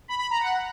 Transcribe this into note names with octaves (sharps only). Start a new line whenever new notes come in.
B5
B5
A#5
F#5